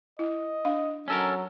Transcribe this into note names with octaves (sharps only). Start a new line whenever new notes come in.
E4 D#5
D4 F5
F#3 C#4 A4 A#4